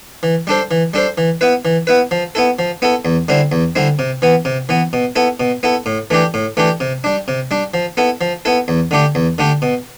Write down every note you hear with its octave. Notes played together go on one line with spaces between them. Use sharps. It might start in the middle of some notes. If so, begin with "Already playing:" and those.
E3
G3 D4 A4 C5
E3
G3 D4 A4 C5
E3
B3 E4 B4
E3
B3 E4 B4
F3
B3 E4 A4
F3
B3 E4 A4
E2
D3 G3 C4 E4
E2
D3 G3 C4 E4
C3
E3 B3
C3
E3 B3
B2
B3 E4 A4
B2
B3 E4 A4
A2
E3 A3 D4 G4
A2
E3 A3 D4 G4
C3
G3 D4
C3
G3 D4
F3
B3 E4 A4
F3
B3 E4 A4
E2
D3 A3 D4 G4
E2
D3 A3 D4 G4
B2